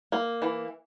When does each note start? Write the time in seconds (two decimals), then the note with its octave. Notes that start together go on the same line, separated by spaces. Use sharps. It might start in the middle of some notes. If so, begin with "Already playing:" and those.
0.12 A#3
0.42 E3